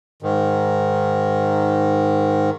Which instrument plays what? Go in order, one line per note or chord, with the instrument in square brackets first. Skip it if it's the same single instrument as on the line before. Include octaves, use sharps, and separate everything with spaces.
[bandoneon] G#2 D#3